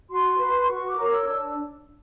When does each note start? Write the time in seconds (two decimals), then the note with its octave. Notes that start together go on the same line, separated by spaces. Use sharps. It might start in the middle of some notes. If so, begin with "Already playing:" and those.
0.10 F#4 C6
0.38 B4
0.68 F#4 C#6
0.88 D6
0.96 A#4 C#5
1.07 E6
1.26 D4 E6